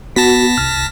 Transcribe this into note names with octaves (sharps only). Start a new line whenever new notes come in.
B3 F#4 A5 A#6 B6
C2 F6